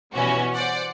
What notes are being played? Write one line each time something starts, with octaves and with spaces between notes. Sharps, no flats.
B2 E3 G3 C#4 F#4
C5 D5 F#5